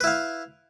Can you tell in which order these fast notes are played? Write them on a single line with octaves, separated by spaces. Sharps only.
B4 E4 F5